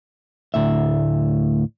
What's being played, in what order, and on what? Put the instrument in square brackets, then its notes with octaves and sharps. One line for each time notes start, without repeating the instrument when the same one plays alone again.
[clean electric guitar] D2 A2 E5